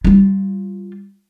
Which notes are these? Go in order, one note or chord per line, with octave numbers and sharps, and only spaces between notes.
G3 F4